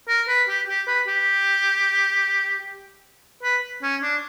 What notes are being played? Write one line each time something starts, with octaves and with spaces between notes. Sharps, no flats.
A#4
B4
G4
G4
B4
G4
B4
C#4
D4